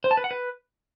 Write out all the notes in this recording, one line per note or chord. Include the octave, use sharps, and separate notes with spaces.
C5
A5
B4
F#5
B4